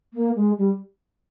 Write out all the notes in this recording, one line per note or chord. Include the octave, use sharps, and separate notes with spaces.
A#3
G#3
G3